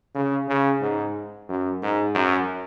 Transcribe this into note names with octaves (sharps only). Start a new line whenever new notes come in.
C#3
C#3
G#2
F#2
G#2
F#2